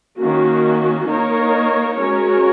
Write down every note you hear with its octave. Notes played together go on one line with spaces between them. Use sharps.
D#3 A#3 C#4 F#4
A#3 D#4 A#4 C#5
G#3 C#4 F#4 A#4 C#5